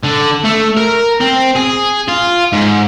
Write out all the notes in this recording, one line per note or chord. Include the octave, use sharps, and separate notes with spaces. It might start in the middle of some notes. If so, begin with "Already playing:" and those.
D3
A3
A#4
C4
G#4
F4
G#2